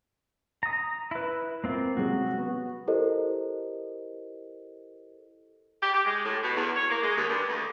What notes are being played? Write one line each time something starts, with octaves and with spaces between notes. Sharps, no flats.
A#5 D#6
E4 B4
A#3 C4 F4
C3 F#3 G#3 F#4
B3
E4 G4 A4 A#4 C5 D#5
G4
G4
G#3
A2
B2
E2
C#5
A#3
G#3
D#2
G2
D2